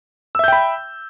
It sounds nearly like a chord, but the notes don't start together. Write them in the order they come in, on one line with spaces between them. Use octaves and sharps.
E6 E5 G6 G5 B5